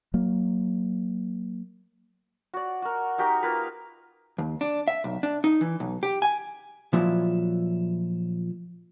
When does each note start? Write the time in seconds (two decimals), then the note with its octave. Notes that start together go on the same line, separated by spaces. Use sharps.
0.14 F#3 A#3
2.54 F#4 D5
2.82 F#4 A#4
3.18 D#4 F#4 G4 A#4
3.43 A#3 F4 A#4 B4
4.38 D#2
4.61 D4
4.88 E5
5.04 B1
5.23 D4
5.44 D#4
5.61 E3
5.80 B1
6.03 G4
6.22 G#5
6.93 A#2 F3 F#3 E4